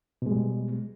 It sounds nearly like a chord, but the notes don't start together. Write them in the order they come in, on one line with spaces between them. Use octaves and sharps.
B2 G#3 G3